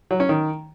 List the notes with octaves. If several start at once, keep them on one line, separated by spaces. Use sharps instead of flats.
F#3
C#4
D#3